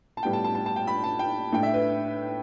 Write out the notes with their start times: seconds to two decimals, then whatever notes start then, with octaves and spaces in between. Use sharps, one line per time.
0.17 A5
0.23 A2 G3 B3 G5
0.33 A5
0.44 A5
0.55 A5
0.66 A5
0.76 G5
0.87 B5
1.04 A5
1.19 G5
1.52 A2 A3 D4 G5
1.63 E5
1.74 B4